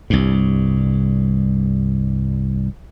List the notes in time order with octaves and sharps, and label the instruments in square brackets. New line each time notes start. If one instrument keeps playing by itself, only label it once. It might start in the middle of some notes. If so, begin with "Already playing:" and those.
[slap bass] C2 G2